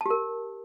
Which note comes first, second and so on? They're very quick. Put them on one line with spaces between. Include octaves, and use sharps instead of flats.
A5 G4 A#4